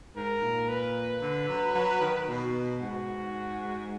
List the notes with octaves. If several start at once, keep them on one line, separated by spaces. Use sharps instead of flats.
G#2 A#4
A#2
B4
D3
F#3
F#3
D#3
B2
G#2 F#4